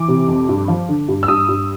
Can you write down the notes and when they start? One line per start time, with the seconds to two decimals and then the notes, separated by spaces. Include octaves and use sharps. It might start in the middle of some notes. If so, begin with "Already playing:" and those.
Already playing: E3 D6
0.08 C3
0.28 F2
0.49 G2
0.68 F3
0.89 D3
1.08 G2
1.23 E6
1.28 G2 D#6
1.48 G2